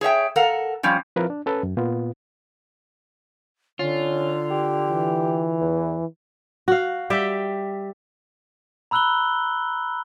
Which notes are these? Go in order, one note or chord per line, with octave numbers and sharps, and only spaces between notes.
G#4 C#5 E5 G5
A4 A#4 F5 F#5
F3 G3 C4 C#4
F3 C4 E4 A#4 B4 F5
D4
C#4 A4 B4
F#2
A#2 B3 F4
D3 C#4 F4
G4
E3
E2
F#4 F5
G3 G4 E5 G5
A#5 B5 E6 F#6 F#7 G7